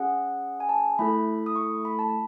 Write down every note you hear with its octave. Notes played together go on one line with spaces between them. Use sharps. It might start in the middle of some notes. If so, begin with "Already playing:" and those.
Already playing: C#4 G#4 F#5
G#5
A5
A3 E4 A4 B5
D#6
C#6
B5
A5